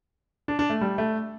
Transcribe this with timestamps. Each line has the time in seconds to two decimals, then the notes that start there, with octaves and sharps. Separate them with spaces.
0.48 D4
0.59 D4
0.70 A3
0.81 G3
0.98 A3